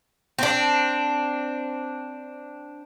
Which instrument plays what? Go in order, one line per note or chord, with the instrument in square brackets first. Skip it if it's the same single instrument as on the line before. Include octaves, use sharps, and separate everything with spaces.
[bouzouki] C4 D4